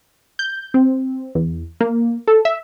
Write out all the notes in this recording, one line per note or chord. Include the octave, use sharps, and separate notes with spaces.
G6
C4
E2
A#3
A4
E5